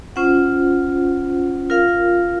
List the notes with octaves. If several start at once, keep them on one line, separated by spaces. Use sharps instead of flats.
C#4 F4 C5 F#5
F4 A#4 F5